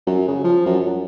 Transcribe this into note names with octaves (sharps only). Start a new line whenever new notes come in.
F#2
C#3
F3
F#2
F#2